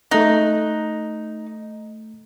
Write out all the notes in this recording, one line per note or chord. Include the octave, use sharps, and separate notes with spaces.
A3 D#4 F#6